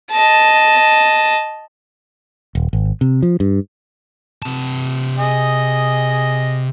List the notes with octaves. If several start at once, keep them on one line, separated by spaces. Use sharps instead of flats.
D#5 A5
D#1
G#1
C3
F3
G2
C3 A5
G#4 D#5